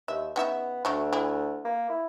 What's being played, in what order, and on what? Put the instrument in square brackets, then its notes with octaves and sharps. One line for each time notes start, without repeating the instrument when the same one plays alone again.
[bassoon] D#2 [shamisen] E5
[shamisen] C#3 D#4 E5 [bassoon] B3
[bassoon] D2 [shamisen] F#3 A3 D4
[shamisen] E4 G#4
[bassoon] A#3
E4